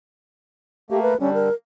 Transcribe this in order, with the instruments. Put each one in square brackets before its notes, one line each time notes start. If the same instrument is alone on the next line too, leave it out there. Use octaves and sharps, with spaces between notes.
[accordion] A3 A#3 [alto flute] G4
[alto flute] B4
[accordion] D3 G3 [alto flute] C#4
[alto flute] A#4